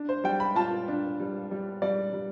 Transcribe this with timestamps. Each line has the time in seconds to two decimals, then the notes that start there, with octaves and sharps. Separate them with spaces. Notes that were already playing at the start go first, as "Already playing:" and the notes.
Already playing: D4
0.09 C5
0.24 G3 G5
0.40 B5
0.55 F4 A5
0.88 D4
1.20 G3
1.51 G3
1.82 G3 D5
2.13 G3